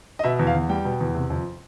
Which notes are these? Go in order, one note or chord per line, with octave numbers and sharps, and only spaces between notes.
D#5
B2 E5
E2
F5
E2
G3 G5
B2
E2
C3
F2